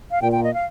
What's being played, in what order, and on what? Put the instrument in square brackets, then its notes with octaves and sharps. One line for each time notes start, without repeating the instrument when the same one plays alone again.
[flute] F5
[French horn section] A#2 [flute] G5
[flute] G5
D#5
F5